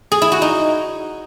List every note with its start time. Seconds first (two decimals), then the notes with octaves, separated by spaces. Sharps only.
0.12 G#4
0.22 E4
0.32 F#4
0.42 D#4